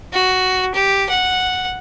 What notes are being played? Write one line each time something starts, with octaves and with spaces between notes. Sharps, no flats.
F#4
G4
F#5